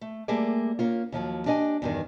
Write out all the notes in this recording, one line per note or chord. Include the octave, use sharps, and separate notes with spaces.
A3
G3 A3 A#3 G4 G#4 D5
A#3 C#4 F4
D#2 F3 F#3
D4 G4 D#5 F5 G#5
E2 G2 D#3